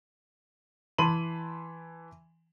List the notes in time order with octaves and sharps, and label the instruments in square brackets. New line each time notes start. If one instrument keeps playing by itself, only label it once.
[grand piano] E3 A5 B5 C6 D#7 F#7